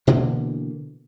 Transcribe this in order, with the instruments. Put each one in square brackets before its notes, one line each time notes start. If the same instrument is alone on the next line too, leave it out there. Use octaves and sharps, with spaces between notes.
[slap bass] B2 D3 E3 A#3